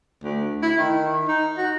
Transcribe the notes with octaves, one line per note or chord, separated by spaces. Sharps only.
D2
E4
D#3
D#4
F#4